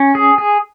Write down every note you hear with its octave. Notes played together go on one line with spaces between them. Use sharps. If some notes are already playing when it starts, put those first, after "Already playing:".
Already playing: C#4
G#4
G#4